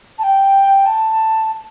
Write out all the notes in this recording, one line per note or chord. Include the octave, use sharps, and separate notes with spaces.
A5
G5
A5